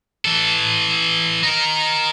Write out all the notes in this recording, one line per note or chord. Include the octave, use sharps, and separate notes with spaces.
E3 A4
D#4 A#4